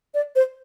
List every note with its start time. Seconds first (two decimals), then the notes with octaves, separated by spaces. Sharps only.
0.14 D5
0.36 C5